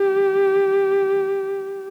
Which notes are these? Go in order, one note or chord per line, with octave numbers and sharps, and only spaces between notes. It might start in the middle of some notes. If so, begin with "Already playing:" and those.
Already playing: G4